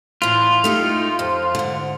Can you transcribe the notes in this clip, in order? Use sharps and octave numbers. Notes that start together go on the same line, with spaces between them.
A2 E3 F4
A3 D#4 G4
F2
G#2 D3